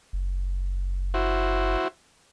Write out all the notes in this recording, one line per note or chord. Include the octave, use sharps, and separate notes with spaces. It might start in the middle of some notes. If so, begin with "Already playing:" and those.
F#1
E4 F#4 C5